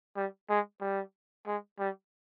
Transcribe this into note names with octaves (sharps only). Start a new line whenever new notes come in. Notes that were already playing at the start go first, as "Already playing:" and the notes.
G3
G#3
G3
G#3
G3